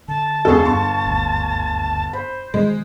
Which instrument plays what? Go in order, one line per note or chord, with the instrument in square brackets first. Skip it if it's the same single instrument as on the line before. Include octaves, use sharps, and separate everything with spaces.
[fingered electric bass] D3 [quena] A5
[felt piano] E1 C#2 C#6 [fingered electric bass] B2 D4 [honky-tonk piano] G#4 A4
[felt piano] G1 C6 [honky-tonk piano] C#6
[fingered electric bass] F#1 D2
[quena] C5 [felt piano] B5
[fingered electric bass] B2 D#3 E3 [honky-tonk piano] G#3